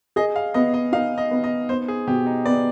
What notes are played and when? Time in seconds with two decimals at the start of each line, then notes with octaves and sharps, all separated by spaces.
0.16 G#4 D#5
0.36 F5
0.54 B3 D#5
0.74 D#5
0.92 D#4 F5
1.18 D#5
1.31 B3
1.44 D#5
1.69 B3 C5
1.88 G#4
2.07 B2 G4
2.26 D#4
2.46 B3 D5